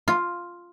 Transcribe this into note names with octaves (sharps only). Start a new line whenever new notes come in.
F4